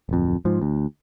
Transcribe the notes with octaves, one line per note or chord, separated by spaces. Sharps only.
D1 F2
G#2 F3
D2